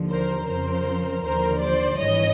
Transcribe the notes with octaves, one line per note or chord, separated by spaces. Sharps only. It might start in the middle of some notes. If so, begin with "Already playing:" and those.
Already playing: D#2 D3 F3
A#4 C5
F2 C#3 F3 A#4 C5
D#2 D3 F3 A#4 C5
C5 D5
G#1 G2 E3 C#5 D#5